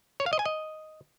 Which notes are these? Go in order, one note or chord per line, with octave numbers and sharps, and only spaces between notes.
C#5
F5
D#5
G#5
D#5